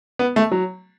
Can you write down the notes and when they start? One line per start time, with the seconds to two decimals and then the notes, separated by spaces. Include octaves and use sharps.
0.19 B3
0.36 A3
0.52 F#3